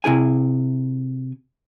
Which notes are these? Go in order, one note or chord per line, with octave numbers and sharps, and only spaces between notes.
C3 E4 G#4 G#5